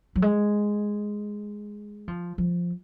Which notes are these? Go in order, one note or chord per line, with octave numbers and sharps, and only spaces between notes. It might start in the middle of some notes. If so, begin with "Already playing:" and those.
F#3
G#3
F3
F3